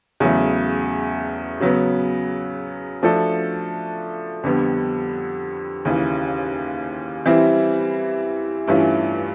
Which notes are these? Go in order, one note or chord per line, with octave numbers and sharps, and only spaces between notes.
E2 C#3 F#3 A3
C#3 F#3 B3
F3 A3 D4 F#4 A4
F2 D3 G3 B3
D#2 C#3 E3
E3 G3 C4 E4
G2 E3 A3 C#4 F4